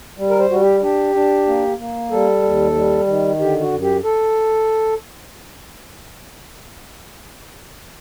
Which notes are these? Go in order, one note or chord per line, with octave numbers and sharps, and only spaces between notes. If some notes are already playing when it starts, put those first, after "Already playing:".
G3
A#4
C5
G3 F#4
G4
D4 G4
D4
A#3
A#3
G3 A4
D#2
G3
D#3
D3 G4
F#4
F#2
G4
A4